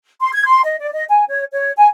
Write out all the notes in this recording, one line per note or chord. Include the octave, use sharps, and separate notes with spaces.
C6
G#6
C6
D#5
D5
D#5
G#5
C#5
C#5
G#5